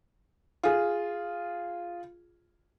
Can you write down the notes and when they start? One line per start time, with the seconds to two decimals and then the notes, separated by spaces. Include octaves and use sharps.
0.63 F4 G#4